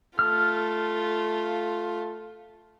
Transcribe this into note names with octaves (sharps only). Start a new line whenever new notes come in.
A3 F4 F6